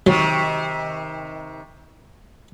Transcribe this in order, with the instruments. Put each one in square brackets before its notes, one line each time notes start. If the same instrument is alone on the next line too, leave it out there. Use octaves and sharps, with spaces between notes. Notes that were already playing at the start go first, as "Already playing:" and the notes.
[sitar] C3 D#3 [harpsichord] F#3